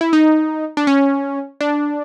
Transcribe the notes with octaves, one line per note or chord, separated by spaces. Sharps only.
E4
D#4
D4
C#4
D4